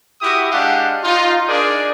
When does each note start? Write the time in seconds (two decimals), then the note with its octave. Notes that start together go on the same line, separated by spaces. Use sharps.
0.22 E4 F#4 G4 D#6
0.52 G#3 D4 G4 F5 F#5
1.04 D#4 F4
1.48 D4 D#4 G#4 A#4 D5